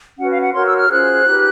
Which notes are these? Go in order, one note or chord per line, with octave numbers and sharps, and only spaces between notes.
C#4 F#4 B4 F#5
F5
F#5
F#4 A#4 C#5 C6
E6
F6
C#4 F4 G#4 C5 F#6
D#4 G4 B4